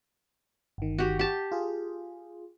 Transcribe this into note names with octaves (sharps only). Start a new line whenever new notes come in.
G1 D#3
F#4 G4
G4 A5
F4 G#4